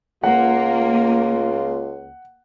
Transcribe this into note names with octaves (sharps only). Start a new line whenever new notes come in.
C#2 A#3 F4 F#5